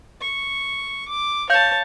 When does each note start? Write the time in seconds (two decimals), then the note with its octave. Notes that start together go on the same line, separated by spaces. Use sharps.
0.21 C#6
1.08 D6
1.50 C#5 F5 A5 G6